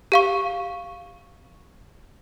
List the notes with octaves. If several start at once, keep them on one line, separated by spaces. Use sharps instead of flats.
G4 F5 C#6